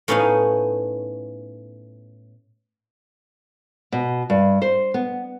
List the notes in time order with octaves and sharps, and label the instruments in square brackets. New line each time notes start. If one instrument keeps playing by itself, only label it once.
[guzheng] A2 B3 C#4 D#4 F5 G#5
[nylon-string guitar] B2
G2
C5
B3